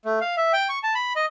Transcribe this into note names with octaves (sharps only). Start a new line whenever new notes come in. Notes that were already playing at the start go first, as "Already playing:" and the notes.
A3
F5
E5
G5
C#6
A5
B5
D#5